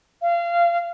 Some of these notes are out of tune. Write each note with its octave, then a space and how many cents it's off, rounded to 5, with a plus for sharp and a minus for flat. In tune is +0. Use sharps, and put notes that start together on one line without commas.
F5 -25